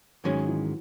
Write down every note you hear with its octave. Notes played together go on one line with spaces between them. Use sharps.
G#2 D#3 F#3 G#3 C#4 G#4
E3